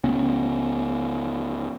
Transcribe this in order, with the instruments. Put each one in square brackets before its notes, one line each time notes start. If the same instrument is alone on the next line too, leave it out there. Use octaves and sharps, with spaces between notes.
[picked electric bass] C#2 B3 C#4